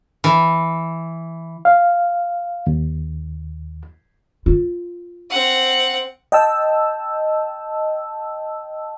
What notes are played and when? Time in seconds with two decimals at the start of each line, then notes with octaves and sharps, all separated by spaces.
0.24 E3
1.65 F5
2.67 D#2
4.46 F4
5.30 C4 F#5
6.32 D#5 G5 A5 E6